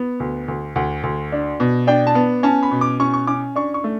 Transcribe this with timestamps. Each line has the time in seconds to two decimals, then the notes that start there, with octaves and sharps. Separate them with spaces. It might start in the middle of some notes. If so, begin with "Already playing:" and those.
Already playing: B3
0.20 D2
0.48 D2
0.76 D2 F#5
1.03 D2
1.32 D4
1.60 B2
1.87 D4 G5
2.07 A5
2.15 B3
2.43 C#4 A5
2.63 B5
2.72 B2
2.81 D6
3.00 C#4 C#6
3.14 C#6
3.27 C#4 D6
3.56 D4 C#6
3.74 C#6
3.84 A3